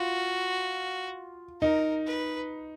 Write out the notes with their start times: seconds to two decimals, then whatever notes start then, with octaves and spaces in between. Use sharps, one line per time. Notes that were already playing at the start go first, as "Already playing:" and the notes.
Already playing: F4 F#4
1.61 D#4 A#4
2.06 B4